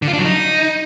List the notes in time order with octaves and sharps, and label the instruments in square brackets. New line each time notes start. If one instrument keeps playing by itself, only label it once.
[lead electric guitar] D3
F4
D4
F#3
D#4